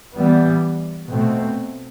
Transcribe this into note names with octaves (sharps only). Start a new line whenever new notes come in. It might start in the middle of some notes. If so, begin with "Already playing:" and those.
E3 G3 B3
B2 A3 C4